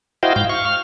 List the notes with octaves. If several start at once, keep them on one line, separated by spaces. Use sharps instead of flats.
E4 F#4 C5 D#5 F5 G5
G#2 F5 G6
F5 C#6
F6